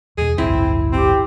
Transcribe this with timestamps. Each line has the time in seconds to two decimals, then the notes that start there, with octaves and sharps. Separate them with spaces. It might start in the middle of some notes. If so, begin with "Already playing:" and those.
0.18 E2 B2 G#4
0.38 A1 D2 G2 C4 E4
0.93 C4 G4